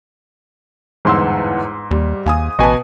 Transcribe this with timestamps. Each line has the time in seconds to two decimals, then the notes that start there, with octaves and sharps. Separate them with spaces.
1.05 G1 E2 G#2 C6 E6
1.91 D#2 G3
2.26 D#2 F5 G#5 D#6
2.59 A1 B2 B4 D#5 G#5 A5